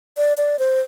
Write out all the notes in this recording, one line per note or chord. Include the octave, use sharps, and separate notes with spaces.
D5
D5
C5